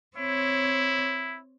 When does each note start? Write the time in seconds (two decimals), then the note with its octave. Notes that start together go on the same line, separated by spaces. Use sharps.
0.17 C4 E4 C#5